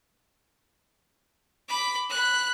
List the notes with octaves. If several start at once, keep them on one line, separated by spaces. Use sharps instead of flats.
B5 D6
B5 F#6